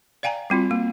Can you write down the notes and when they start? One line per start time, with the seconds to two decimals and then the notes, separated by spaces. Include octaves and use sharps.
0.23 D5 F5 G5 G#5 A#5
0.50 G3 C4 F4 F#4
0.71 A#3